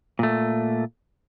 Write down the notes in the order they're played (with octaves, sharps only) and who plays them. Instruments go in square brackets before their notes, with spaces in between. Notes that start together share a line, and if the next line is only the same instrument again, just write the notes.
[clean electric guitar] A#2 A3